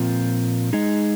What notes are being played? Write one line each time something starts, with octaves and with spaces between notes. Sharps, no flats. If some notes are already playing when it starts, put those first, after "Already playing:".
Already playing: A#2 F3 C4 F4 A#4
G#3 D#4 G#4 D#5